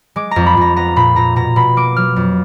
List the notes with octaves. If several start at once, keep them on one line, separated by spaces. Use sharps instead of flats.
G#3 D6
F2 A#5
B5
F2 A#5
B3 A#5
A#2 B5
A#2 A#5
B2 A#5
B2 B5
A#3 D6
F#3 F6
F2